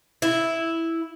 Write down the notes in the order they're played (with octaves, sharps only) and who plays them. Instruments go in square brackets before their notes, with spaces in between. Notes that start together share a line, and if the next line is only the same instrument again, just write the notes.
[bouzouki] E4